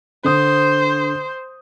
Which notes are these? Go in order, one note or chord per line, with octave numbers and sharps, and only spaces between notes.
D3 C5 D#6